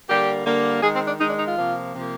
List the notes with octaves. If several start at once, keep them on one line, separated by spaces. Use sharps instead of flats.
D3 G3 A#3 G4
D3 G3 A#3
D#3 G#3 G#4
C4
D4
D#3 G#3 D#4
D4
D#4
F4
C3 F3 A#3
C3 F3 A#3